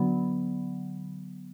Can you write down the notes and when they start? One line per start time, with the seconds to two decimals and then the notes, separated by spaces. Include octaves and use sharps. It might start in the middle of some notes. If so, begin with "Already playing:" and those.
Already playing: D3 F#3 B3